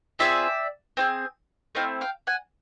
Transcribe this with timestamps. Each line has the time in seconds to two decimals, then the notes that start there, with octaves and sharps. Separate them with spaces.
0.19 C4 F4 G#4 D5 E5
0.97 C4 F4 G#4
1.75 A3 C4 E4 D#5 F5
2.01 F5 G5
2.27 F#5 G#5